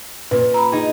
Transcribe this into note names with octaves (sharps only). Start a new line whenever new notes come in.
A#2 C#4 B4
A#5 B5
D#4 G#4